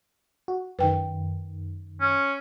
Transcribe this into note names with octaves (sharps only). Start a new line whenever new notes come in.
F#4
F#2 D#3 B4 G5
C#4